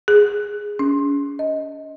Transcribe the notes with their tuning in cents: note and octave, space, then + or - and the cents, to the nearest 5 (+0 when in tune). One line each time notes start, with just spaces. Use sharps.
G#4 -5
C#4 +40
D#5 +15